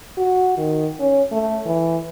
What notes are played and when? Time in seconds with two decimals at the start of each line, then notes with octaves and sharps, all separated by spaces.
0.17 F#4
0.58 D#3
1.00 C#4
1.32 A3
1.66 E3